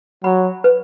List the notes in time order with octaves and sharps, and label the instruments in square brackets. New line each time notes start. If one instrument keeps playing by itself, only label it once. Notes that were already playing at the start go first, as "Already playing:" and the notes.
[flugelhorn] F#3 [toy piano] B5
[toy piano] B4